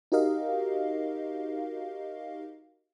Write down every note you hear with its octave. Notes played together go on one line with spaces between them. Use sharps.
D#4 F#4 G4 A#4 D#5 F5